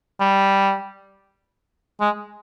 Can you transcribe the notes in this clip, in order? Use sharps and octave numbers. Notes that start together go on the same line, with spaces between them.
G3
G#3